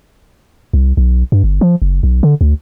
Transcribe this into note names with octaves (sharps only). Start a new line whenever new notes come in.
C2
B1
G2
G1
F3
F#1
B1
D3
D2